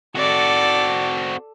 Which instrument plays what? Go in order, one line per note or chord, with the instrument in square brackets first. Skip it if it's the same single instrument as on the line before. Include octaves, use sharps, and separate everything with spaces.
[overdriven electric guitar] C4 F#4 [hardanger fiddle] A4 D5